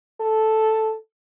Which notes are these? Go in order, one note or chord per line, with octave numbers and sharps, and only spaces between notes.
A4